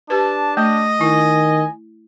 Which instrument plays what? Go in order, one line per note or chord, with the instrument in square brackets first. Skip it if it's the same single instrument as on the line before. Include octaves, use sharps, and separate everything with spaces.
[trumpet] D4 [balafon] G4 B4 [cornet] A5
[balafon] A3 [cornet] D#5
[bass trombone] D#3 [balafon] E4 [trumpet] G#5